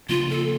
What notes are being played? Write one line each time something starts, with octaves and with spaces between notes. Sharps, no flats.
C#3 F3 A#3 D4 F4
A4